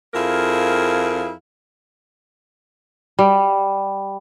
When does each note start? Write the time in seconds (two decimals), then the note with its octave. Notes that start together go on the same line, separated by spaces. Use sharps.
0.14 F2 E4 G#4 A#4 F5
3.19 G3